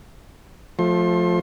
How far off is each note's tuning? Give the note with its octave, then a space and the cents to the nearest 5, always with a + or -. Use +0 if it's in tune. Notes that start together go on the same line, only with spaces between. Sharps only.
F3 +15 A3 -10 C6 +35